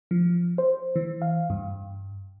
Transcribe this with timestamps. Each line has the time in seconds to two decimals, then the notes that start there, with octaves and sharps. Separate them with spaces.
0.11 F3
0.58 C5
0.96 E3
1.22 F5
1.50 G2